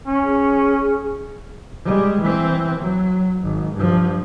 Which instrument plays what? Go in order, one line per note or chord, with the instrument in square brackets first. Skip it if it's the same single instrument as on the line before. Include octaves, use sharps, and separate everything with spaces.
[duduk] C#4
[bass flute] G#4
[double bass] G3 G#3
E3 C4
F#3
G#1
G2 F3